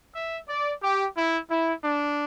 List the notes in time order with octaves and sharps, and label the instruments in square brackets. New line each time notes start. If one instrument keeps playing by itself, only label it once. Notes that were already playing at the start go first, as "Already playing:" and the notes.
[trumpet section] E5
D5
G4
E4
E4
D4